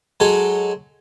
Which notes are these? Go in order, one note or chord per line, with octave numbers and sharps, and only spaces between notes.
F#3 G#3 A4